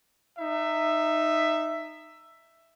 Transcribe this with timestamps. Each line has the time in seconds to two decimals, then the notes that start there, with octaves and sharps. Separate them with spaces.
0.37 D#4 E5